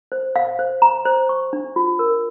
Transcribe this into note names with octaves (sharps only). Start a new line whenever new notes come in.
C5
F5
C5
A#5
C5
C#6
D4
F4
A#4